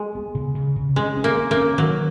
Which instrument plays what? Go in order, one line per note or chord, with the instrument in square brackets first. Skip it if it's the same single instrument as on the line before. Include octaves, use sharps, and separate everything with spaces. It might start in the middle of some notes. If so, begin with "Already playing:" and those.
Already playing: [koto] G#3
[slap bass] B3
C#3
C#3
C#3
[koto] G#3 [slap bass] C#4
[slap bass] C#4
[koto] A#3
[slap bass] C#4
[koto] A#3
[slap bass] C#4
[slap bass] D#3 [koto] F#3